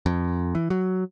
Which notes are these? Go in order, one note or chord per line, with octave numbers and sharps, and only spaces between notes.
F2
E3
F#3